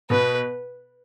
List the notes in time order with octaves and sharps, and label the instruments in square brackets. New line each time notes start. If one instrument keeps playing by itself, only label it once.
[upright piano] B2 B3 [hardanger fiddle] B4